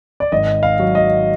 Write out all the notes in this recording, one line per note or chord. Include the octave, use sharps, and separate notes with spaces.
D5
G#1 D#5
F5
F#3
D#5